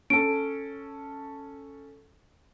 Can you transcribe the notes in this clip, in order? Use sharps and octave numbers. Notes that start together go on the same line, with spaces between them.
C#4 A4 D7